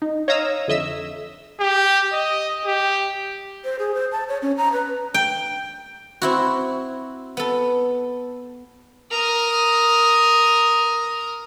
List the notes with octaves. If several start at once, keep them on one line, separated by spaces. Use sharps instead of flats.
D#4
C#5 D#5 F5 A#5 D#6 E6
F2 D3 D#5 E5 E6
G4
D#5
G4
C5
G#4
C5
A5
C#5
C#4
A#5
B4
G5
C4 E4 F#4
B3 A4
A#4 D#6